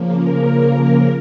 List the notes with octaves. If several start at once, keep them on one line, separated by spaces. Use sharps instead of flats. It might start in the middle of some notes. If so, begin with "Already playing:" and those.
Already playing: C#3 F3 A#3
A#4